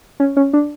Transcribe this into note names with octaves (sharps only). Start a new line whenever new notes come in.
C#4
C#4
D4